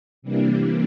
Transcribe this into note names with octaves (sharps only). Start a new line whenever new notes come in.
C3 E3 G3 A#3 D4